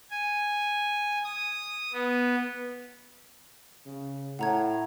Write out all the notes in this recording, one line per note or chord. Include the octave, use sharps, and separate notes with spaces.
G#5
D#6
B3
C#3
A2 F#5 A#5 G#6